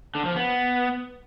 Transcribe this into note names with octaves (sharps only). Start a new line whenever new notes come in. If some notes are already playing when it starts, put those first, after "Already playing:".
D3
F3
B3